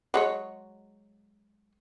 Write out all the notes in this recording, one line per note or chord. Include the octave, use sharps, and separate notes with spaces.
F#3 G#3 C#5